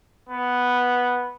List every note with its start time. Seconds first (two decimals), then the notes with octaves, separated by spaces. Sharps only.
0.29 B3